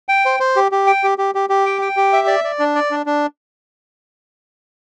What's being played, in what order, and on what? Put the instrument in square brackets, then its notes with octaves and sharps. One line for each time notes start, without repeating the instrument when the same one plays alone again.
[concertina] G5
C5
C5
G4
G4
G5
G4
G4
G4
G4
G5
G5
G4
E5
D5
D5
D4
D5
D4
D4